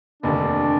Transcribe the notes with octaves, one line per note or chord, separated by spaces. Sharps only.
F1 D#2 D3 D4